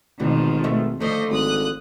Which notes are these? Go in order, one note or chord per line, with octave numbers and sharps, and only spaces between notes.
G#1 D2 B2 D#3 F3
B2 A3 E5
D3 F3 A3 C5 D#5
G#1 D#6 F#6